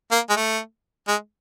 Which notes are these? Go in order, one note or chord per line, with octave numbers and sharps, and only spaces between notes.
A#3
G#3
A3
G#3